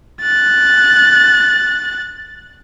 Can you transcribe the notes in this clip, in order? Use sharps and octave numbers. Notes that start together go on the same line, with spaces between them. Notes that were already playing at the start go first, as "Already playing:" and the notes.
F#6 A6